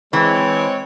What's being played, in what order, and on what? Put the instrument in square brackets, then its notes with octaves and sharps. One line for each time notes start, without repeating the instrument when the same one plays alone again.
[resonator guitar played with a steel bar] E3 [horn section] G#3 C4 C#5